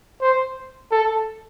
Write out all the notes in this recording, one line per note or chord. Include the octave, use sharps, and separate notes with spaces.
C5
A4